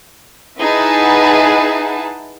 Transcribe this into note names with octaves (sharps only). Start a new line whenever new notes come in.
D#4 E4 G#4 B4 F#5 A5